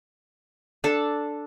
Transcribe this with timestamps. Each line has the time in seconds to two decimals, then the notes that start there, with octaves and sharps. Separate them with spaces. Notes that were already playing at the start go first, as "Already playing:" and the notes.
0.84 D4 A4 A5